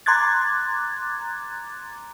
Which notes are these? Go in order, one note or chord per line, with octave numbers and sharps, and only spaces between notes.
A#5 C6 D6 F#6 G#6 A6